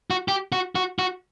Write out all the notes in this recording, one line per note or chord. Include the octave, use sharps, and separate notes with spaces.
F#4
G4
F#4
F#4
F#4